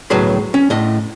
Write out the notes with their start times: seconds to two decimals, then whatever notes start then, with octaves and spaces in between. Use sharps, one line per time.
0.10 C#2 A2 F#3 B3 G#4 B5
0.54 C#4
0.70 A2 D#5